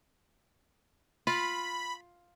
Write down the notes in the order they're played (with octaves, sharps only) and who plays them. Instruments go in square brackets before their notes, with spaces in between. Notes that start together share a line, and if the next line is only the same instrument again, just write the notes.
[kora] F4 [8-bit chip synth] B5